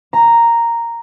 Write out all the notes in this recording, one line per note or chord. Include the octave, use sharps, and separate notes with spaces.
A#5